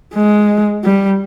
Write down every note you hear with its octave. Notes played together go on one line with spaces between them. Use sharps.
G#3
G3